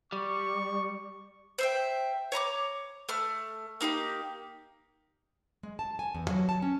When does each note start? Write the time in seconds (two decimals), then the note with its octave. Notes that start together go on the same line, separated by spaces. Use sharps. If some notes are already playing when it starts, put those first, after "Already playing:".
0.12 G3 C#6
1.58 C5 E5 G5
2.32 C#5 A#5 B5 D6
3.09 A3 F6
3.81 A#3 D#4 G4 D6
5.63 G#3
5.79 A5
5.99 G#5
6.15 E2
6.29 F#3
6.49 A5
6.62 C#4